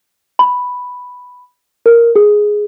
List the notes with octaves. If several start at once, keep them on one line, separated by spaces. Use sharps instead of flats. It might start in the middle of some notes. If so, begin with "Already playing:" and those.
B5
A#4
G#4